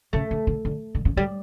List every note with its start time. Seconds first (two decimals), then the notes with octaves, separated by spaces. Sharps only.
0.13 C#3 A3
0.31 D3
0.47 D3
0.65 D3
0.95 D3
1.05 C#3
1.17 D3 G3